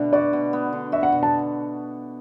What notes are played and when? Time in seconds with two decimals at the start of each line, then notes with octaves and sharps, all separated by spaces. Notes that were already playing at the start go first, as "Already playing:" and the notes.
Already playing: B2 D3 A3 D4
0.13 F#4 D5
0.33 B2
0.53 B3
0.73 D3
0.92 F#4 E5
1.03 F#5
1.12 B2
1.23 A5